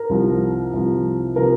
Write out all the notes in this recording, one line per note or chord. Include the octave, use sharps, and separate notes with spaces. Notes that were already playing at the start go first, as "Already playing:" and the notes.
Already playing: A#4
C2 C3 F3
C2 C3 F3
C3 F3 A#4